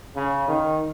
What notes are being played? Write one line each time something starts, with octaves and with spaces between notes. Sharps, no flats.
C#3
D#3